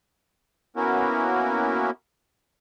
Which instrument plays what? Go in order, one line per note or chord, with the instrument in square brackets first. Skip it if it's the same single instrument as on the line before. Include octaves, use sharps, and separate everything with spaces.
[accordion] A#3 B3 C#4 E4 F#4 A#4